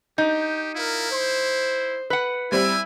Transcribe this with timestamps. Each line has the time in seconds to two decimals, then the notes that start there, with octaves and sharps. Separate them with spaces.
0.18 D#4 G4 G6
0.75 E4 F4 A#4
1.11 C5
2.10 B4 F#5
2.52 G3 C4 E4 G#5